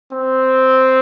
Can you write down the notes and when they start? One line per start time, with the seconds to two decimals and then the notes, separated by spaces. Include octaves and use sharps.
0.12 C4